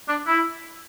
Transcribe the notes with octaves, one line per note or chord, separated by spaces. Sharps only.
D4
E4